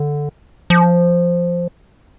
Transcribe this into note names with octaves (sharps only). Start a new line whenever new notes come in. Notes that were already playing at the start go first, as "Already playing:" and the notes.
Already playing: D3
F3